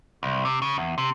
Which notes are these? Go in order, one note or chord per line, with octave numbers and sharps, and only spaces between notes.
C2
C3
C#3
E2
C3